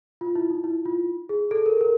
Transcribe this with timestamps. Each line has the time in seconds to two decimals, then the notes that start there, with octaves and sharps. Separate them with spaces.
0.21 F4
0.35 E4
0.50 D#4
0.64 E4
0.86 F4
1.29 G#4
1.51 A4
1.66 A#4
1.81 A#4